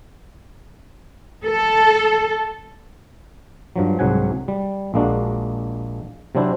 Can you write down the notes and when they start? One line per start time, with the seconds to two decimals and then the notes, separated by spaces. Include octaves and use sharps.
1.45 A4
3.76 G2 F3 F#3
3.99 C2 G#2 F#3 F#5 G#5
4.48 G3
4.94 A#1 G#3 A#3 D4 F#4
6.35 C3 F#3 C4 D4 E4 C5